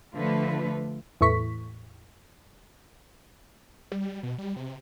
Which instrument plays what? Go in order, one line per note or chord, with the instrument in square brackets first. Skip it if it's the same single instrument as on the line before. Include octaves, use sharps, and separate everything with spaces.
[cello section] D3 F3 A3 F4 B4
[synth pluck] E2 A2 C#6 B6
[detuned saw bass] G3
B2
G3
C3